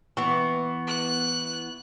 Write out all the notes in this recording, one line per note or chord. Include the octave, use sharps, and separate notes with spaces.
E3 B3 C#6
F#6